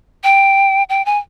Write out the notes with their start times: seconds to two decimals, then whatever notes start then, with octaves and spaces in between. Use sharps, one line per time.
0.24 G5
0.89 G5
1.06 G#5